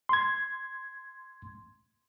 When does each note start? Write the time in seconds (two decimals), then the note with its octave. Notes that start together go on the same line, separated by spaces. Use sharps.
0.09 C6 G#6